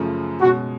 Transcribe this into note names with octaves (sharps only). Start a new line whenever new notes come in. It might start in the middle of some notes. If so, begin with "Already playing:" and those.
Already playing: F#2 C#3 F3 A3
B2 G#3 C#4 F#4